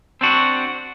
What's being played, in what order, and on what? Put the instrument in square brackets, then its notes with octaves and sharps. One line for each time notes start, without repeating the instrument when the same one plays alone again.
[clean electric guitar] C4 D4 F#4